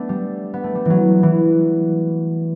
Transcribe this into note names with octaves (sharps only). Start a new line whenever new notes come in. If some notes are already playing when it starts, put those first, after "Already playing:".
Already playing: A3 B3 D4
G3
B3
A3
G3
E3 F#3
E3